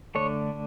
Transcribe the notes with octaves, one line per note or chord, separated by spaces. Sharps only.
D3 A3 D4 C#5